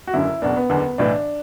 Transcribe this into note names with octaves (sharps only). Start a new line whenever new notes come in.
F#4
F#1 F#2 D3 E4
F#1 E2 B2 D4
B3
F#1 E2 D3
B1 A2 E3 D4